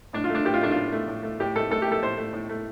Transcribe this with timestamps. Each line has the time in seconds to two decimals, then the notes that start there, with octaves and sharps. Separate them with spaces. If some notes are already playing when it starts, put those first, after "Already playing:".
0.13 A2 D4
0.24 F4
0.30 A3
0.35 D4
0.45 A2 G4
0.54 F4
0.61 A3 D4
0.71 F4
0.76 A2
0.92 A3
1.08 A2
1.23 A3
1.40 A2 G4
1.56 A3 A4
1.70 A2 A4
1.82 G4
1.86 A3
1.92 A4
2.02 A2 C5
2.17 A3
2.33 A2
2.49 A3